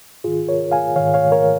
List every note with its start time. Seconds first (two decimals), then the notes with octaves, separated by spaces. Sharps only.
0.24 G#2 D#3 F4 G#4
0.48 A#4 C#5
0.72 F5 G#5
0.96 G#2 D#3 C#5 F5
1.14 C#5 F5
1.32 A#4 C#5